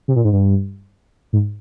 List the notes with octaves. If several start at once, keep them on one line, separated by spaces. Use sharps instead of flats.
C3
A#2
G#2
G2
G#2